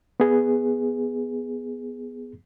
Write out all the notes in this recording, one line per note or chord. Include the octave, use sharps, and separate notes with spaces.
B3 G#4